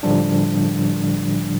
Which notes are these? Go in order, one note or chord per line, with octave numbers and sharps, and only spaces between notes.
A2 D3 F3 G3 D4